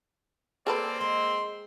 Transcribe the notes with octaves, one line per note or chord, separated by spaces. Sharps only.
A#3 C4 G#4 A4 B4 D5
G#3 C6